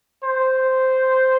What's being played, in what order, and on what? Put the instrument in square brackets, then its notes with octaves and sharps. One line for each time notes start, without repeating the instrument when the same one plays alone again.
[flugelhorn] C5